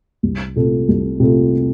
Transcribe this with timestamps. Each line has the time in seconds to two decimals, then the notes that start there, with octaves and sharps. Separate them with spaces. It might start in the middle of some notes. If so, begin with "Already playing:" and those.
0.23 C2
0.56 C3 A3 F4 A4
0.88 C2
1.20 C3 A3 F4 A4